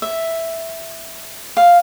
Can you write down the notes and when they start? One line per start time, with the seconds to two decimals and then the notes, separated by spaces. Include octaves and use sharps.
0.02 E5
1.57 F5